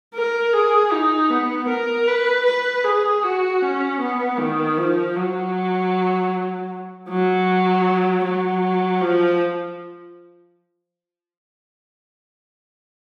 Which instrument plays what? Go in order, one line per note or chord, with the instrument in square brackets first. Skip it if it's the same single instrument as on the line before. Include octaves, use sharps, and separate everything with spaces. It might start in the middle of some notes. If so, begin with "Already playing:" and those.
[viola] A#4
G#4
D#4
B3
A#4
B4
B4
G#4
F#4
C#4
B3
D#3
F3
F#3
F#3
F#3
F3